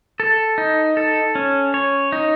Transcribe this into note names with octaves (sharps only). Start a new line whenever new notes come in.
A4
D#4
A4
C#4
C#5
D#4